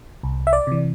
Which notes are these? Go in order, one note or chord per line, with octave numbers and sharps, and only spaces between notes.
C2
E5
D5
C3 E3